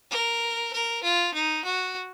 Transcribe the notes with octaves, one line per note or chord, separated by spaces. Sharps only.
A#4
A#4
F4
D#4
F#4